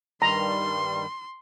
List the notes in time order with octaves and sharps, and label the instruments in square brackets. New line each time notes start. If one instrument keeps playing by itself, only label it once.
[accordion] G2 D#3 G3 [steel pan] A#5 [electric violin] C6